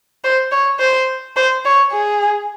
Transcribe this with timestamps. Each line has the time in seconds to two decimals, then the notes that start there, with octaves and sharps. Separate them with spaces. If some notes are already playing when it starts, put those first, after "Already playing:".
0.24 C5
0.51 C#5
0.80 C5
1.37 C5
1.65 C#5
1.92 G#4